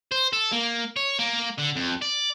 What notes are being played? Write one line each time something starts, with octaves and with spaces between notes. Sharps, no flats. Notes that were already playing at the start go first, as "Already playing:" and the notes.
C5
A4
A#3
C#5
A#3
D3
F2
D5